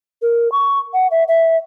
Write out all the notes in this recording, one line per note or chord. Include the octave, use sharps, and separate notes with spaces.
A#4
C#6
F#5
E5
E5